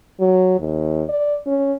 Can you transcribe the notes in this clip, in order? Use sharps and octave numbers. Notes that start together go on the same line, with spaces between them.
F#3
D#2
D5
C#4